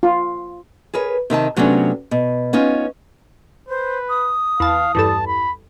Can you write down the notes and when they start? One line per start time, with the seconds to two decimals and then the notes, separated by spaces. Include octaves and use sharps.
0.03 F4
0.94 G#4 A#4 B4 C#5
1.30 C3 D#3 E5 A5
1.56 C3 F#3 A3 B3 C#4 D4
2.11 B2
2.53 B3 C#4 D#4 F4
3.69 B4 C5
4.09 D#6
4.60 E2 F5 A5
4.95 E2 G2 A4 A5
5.27 B5